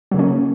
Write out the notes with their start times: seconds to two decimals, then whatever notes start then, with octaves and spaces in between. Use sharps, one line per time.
0.11 F#3
0.14 C#3
0.17 A#3
0.19 C#4